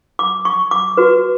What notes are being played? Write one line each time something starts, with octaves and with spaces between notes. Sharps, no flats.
D6
C#6
D6
F#4 B4